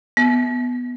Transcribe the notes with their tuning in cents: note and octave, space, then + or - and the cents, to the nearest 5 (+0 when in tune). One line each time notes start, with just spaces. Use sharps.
B3 +0 E5 -20